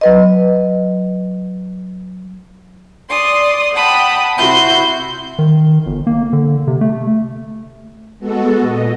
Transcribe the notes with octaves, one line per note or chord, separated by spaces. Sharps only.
F#3 B4 D#5
D5 C6 D#6
F#5 G5 A5 B5 D#6
C3 E4 F#4 C6 G6
D#3
G1
A#3
D3
C3
A3
G#3 B3 F#4 A4
A#2 D#5